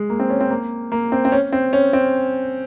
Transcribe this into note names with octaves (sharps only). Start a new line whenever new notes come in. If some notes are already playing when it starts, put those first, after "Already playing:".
Already playing: G#3
A#3
C4
C#4
C4
A#3
A#3
C4
C4
C#4
C4
C#4
C4